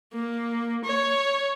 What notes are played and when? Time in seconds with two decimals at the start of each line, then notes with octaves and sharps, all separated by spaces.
0.13 A#3
0.84 C#5